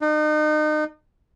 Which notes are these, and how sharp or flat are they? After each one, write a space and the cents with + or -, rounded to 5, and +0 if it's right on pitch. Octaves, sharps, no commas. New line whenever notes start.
D#4 -35